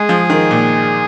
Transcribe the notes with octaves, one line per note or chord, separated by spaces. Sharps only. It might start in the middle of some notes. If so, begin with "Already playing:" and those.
Already playing: G#3 G#4
F3
D#3
A#2